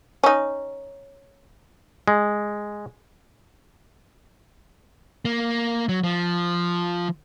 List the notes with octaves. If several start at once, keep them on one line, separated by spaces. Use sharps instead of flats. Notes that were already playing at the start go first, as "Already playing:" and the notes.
C#4 D#4
G#3
A#3
F#3
F3